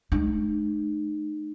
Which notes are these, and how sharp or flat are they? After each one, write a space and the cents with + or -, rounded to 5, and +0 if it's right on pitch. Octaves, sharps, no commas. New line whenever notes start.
G#3 +45 D#4 -35